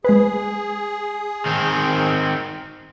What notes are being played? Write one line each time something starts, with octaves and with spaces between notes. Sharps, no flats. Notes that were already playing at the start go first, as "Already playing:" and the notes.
G#3 G#4 B4
D#3 C4